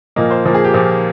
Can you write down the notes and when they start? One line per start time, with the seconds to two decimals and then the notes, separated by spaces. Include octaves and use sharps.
0.16 A#2 F3 A#3 D#5
0.31 C5
0.45 A#2 F3 A#3
0.55 G#4
0.64 G4
0.74 A#2 F3 A#3